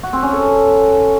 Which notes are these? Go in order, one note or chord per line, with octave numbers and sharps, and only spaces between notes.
F#4
C4
C#4
A4